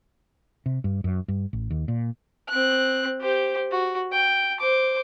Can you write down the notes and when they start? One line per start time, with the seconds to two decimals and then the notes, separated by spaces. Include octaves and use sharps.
0.66 C3
0.84 G2
1.04 F#2
1.28 G2
1.53 A1
1.70 D#2
1.88 A#2
2.48 C4 F#6
3.21 G4 C5
3.71 F#4
4.12 G5
4.60 C5 D6